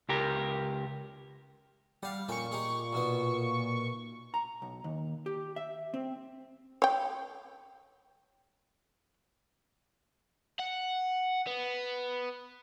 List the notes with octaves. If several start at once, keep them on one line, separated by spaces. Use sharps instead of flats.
C#2 G4 A#4
G3 F5 F#5
F2 A#2 C#4 G5 C#6
D#4 G4 G#4
B1 B2 B3
A#5
B1
D#2
G4
E5
C4
C#5 G5
F#5
B3